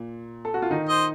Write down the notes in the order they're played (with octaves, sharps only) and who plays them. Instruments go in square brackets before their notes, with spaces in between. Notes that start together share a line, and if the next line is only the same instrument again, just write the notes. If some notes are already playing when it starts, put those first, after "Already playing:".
Already playing: [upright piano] A#2
A4
F#4
F4
D#3 D#4
[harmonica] C5 D#5